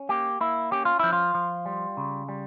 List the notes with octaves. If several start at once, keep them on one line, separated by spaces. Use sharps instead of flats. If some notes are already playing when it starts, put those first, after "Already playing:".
Already playing: C#4
A#3 G4
A#3 E4
C#4 G4
F4
F3 E4
F4
F3
G3
C#3
G3